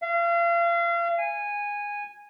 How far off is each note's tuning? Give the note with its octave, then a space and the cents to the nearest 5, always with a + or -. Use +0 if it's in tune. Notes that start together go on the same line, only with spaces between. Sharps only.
F5 -35
G#5 -15